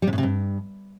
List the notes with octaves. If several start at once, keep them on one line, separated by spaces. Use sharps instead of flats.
G3
C3
A2
C3
G2